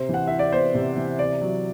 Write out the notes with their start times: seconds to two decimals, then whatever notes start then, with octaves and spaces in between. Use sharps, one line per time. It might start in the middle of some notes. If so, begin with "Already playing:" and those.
Already playing: C3 C5
0.09 E3 F#5
0.27 E4 E5
0.39 D5
0.53 B3 C5
0.74 C3
0.96 E3
1.19 C3 D5
1.41 F#3